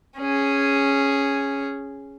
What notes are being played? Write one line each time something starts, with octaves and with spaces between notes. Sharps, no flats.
C#4 G#4